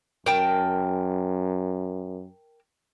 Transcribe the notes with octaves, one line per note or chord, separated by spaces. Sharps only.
F#2 A#4 G5 A5